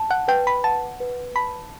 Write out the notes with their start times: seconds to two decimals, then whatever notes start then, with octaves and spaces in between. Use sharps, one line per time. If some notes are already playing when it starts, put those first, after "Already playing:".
Already playing: A5
0.11 F#5
0.28 B4 G5
0.47 B5
0.64 F#5 A5
1.00 B4
1.36 A5 B5